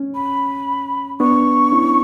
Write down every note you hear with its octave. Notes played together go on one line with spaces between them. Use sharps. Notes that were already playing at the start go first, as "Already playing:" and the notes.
Already playing: C#4
B5
B3 D4 C#6
C#4 E4